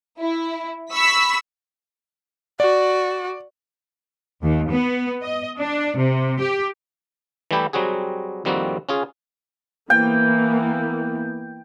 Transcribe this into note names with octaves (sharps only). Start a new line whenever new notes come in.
E4
B5 C#6 E6 B6
F#4 D5
D#2
B3
D#5
D4
C3
G4
E3 G3 A3 E4 G4
F#3 G3 C4 F#4 G#4
F2 D#3 G3 A#3 C4 F#4
C#4 F4 G#4
E3 A#3 B3 G5